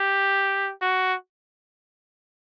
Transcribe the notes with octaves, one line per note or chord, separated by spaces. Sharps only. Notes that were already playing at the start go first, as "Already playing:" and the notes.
Already playing: G4
F#4